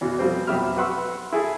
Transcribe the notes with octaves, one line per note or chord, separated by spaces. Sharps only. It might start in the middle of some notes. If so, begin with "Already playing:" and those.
E2 B2
B2 F3 G3 C4
B1 F2 G4 E5 B5 F6
F#4 B4 F#5 C6 E6
E4 G#4 A4